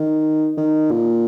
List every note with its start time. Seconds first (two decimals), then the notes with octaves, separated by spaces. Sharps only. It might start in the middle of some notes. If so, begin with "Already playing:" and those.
Already playing: D#3
0.57 D#3
0.91 A#2